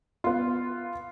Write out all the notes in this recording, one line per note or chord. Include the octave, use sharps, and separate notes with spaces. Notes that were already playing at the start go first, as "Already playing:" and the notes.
B3 F4